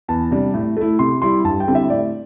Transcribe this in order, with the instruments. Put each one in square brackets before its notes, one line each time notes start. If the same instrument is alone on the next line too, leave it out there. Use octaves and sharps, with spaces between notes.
[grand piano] E2 A5
C3 G3 D4
A2
A3 E4
C3 C6
G3 E4 C6
G2 A5
G5
D3 G3 C4 E4
E5
A2 D5